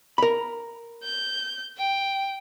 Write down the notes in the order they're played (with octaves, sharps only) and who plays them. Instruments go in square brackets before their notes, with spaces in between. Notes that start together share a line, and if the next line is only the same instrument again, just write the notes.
[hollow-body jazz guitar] A#4 B5
[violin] G6
G5